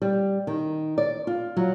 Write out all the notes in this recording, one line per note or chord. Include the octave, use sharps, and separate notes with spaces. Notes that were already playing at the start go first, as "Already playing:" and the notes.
G3
D#3
D5
F4
F#3